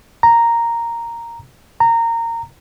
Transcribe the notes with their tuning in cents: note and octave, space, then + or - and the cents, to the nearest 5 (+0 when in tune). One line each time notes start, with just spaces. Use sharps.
A#5 -5
A#5 -20